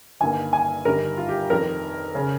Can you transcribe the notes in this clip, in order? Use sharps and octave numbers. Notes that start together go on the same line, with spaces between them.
G1 G2 D#3 A#3 G#5
G#5
G1 G2 D#3 G3 A#4
F4
G4
F1 F2 D#3 A#4
C#3